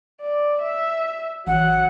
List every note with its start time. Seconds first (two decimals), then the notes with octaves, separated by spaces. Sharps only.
0.21 D5
0.62 E5
1.47 A1 F#3 F#5